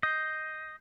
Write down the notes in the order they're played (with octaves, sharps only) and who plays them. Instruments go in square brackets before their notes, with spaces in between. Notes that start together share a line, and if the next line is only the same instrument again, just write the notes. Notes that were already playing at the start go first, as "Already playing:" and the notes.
[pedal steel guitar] D#5 [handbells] G6 C7